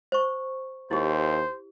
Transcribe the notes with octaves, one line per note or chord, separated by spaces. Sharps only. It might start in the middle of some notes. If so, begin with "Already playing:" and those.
C5 C#6
D#2 E4 G4 C5